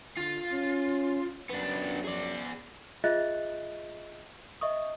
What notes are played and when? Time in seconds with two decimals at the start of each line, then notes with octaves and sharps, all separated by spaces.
0.17 D3 F4
0.52 C#4
1.50 F#2 B3 D4
2.05 G#4 D5
3.04 F4 G#4 D#5 E5 F#6 A6
4.61 D#5 E5 C#6 D#6